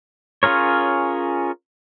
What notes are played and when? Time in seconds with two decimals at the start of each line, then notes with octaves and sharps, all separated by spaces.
0.43 C#4 F4 G#4 A#4 C#5